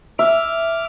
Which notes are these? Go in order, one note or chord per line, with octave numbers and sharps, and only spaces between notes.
E5 D6 F6